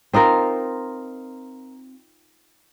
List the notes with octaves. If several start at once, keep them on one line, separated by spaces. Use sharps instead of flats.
C4 D#4 F4 A#4